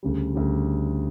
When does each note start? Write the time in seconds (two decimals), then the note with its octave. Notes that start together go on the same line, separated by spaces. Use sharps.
0.03 D2 C#3 G3
0.35 D2 C#3 G3